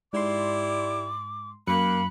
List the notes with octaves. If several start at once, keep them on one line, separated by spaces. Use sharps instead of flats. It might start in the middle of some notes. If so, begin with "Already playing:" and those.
G#2 E4 G4 D5 C6 D6
F#2 A#3 B5 F#6 C#7